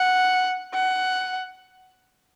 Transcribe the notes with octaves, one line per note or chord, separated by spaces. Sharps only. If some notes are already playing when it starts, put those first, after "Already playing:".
Already playing: F#5
F#5